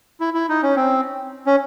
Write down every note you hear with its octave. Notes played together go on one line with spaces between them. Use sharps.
E4
E4
D#4
C#4
C4
C#4